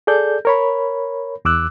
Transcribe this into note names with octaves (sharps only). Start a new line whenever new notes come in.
G#4 A4 D5 G6
A#4 C#5 B5
E2 D6 E6 F#6